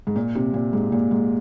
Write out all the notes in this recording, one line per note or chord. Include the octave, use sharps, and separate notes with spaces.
G#2
A#2
C3
A#2
G#2
A#2
G#2